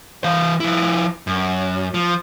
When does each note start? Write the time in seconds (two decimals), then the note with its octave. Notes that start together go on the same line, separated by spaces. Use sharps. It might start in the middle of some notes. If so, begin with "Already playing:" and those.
0.24 E3 F5
0.60 F3 E4
1.27 F#2
1.94 F3